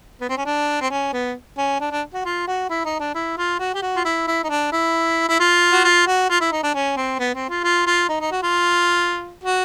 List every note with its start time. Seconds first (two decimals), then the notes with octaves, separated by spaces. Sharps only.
0.21 B3
0.29 C4
0.37 C#4
0.45 D4
0.81 C4
0.90 C#4
1.13 B3
1.58 C#4
1.80 D4
1.92 D4
2.14 F#4
2.25 F4
2.48 F#4
2.70 E4
2.85 D#4
3.00 D4
3.15 E4
3.38 F4
3.59 F#4
3.74 G4
3.82 F#4
3.96 F4
4.05 E4
4.27 E4
4.44 D#4
4.49 D4
4.72 E4
5.29 E4
5.40 F4
5.72 F#4
5.84 F4
6.07 F#4
6.29 F4
6.41 E4
6.52 D#4
6.63 D4
6.74 C#4
6.97 C4
7.19 B3
7.34 C4
7.49 F4
7.64 F4
7.86 F4
8.09 D#4
8.20 D#4
8.31 F#4
8.43 F4
9.44 F#4